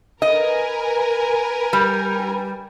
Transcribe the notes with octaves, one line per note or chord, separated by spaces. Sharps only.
A#4 B4 D#5 G#5
G3